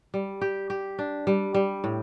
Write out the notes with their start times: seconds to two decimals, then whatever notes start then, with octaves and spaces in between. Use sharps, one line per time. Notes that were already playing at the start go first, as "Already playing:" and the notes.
0.14 G3
0.41 G4
0.70 G4
0.99 D4
1.27 G3
1.54 G3
1.84 A2